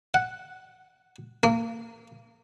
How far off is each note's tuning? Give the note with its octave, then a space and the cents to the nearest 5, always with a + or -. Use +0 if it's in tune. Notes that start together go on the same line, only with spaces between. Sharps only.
F#5 +0
A#3 -25